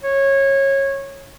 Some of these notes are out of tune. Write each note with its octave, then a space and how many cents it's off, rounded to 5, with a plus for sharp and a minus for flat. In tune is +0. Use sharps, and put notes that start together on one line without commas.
C#5 -20